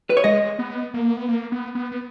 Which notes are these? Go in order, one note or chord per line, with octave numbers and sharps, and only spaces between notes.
B4
C#5
G#3 D#5
B3
A#3
B3
A#3
B3
B3
B3